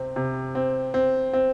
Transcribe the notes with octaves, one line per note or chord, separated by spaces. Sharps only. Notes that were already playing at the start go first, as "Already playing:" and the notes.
Already playing: C3 C4
C3
C4
C4
C4